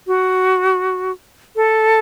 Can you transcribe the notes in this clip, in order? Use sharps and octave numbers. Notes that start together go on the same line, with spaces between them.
F#4
A4